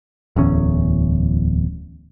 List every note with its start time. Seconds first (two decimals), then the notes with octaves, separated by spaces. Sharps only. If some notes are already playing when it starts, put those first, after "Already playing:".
0.36 D1 E2 C#4